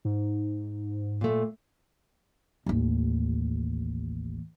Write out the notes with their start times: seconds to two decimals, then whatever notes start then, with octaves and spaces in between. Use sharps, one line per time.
0.05 G#2
1.21 A#2 A3
2.66 A1 D#2